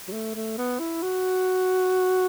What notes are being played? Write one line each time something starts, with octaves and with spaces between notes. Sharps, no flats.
F#3
A3
A3
B3
E4
F#4